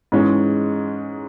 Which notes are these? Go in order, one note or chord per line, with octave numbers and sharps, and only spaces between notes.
G#2 E3 G#3 C#4